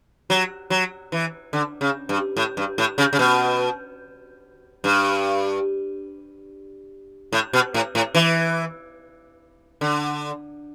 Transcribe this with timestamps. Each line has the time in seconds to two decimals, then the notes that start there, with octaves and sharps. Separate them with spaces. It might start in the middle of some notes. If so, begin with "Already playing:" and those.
0.30 F#3
0.70 F#3
1.12 E3
1.53 D3
1.81 C#3
2.09 G2
2.37 A2
2.57 G2
2.78 A2
2.98 C#3
3.13 C#3
3.19 B2
4.84 G2
7.33 A2
7.53 B2
7.74 A2
7.95 A2
8.15 E3
9.81 D3